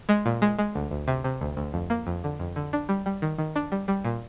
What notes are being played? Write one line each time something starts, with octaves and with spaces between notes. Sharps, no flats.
G#3
A#2
G#3
G#3
D2
D2
C3
C3
D2
D2
F2
A#3
F2
D3
F2
D3
D4
G3
G3
D#3
D#3
D4
G3
G3
A#2